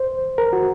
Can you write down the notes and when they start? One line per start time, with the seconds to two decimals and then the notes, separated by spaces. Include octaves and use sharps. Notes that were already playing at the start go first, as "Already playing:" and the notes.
Already playing: C5
0.38 A#4
0.53 F#4